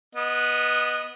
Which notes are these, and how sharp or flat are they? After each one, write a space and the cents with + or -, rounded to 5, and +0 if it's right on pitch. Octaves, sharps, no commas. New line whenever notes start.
B3 -10 D#5 +0